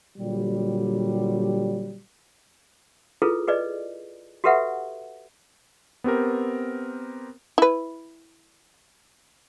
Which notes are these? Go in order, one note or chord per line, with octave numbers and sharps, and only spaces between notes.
A#2 D3 F#3 G3
E4 F4 G#4 A4 B4
G#4 B4 D5 D#5
F#4 G4 A4 B4 E5 F#5
B3 C4 G4 A#4
E4 B4